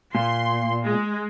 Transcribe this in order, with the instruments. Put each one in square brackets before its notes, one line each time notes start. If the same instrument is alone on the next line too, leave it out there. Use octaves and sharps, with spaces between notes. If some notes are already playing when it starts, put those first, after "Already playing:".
[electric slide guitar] A#2 [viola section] C6
[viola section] G#3